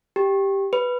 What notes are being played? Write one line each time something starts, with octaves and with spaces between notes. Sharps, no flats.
G4
B4